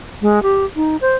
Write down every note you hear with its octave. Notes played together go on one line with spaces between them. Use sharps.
G#3
G4
D#4
C5